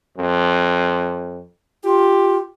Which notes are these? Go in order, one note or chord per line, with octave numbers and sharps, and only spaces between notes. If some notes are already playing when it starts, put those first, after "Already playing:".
F2
F4 G4